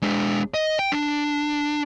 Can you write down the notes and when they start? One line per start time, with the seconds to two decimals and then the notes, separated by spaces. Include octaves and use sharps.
0.02 G#3 D4
0.54 D#5
0.79 G5
0.92 D4